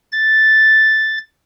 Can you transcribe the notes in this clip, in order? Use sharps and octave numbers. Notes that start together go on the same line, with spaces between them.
A6